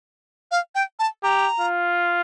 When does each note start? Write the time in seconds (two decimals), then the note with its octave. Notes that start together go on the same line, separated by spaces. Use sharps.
0.51 F5
0.75 G5
0.99 A5
1.23 G4 A#5
1.60 F4